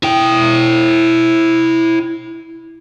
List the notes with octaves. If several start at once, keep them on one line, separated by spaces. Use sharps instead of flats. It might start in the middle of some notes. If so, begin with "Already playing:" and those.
E4 G5